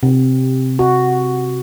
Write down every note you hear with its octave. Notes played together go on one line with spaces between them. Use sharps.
C3
F#4